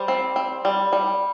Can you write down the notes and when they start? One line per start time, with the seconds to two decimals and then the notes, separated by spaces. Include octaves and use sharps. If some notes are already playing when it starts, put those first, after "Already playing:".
Already playing: G3 C5
0.08 C4
0.36 C4
0.65 G3
0.93 G3